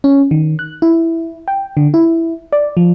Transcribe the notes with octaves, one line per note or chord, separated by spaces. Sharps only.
C#4
D#3
F#6
E4
G5
D3
E4
D5
F3